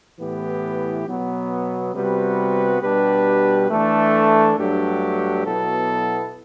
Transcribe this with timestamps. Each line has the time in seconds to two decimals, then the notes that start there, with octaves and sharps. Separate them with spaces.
0.19 A2 E3 B3 E4 G4
1.06 B2 F#3 B3
1.95 C3 G3 B3 F#4 B4
2.82 B2 G3 D4 G4 B4
3.70 E3 A3 D4 A4
4.57 G2 F#3 A3 D4 G4
5.45 B2 F#3 B3 E4 A4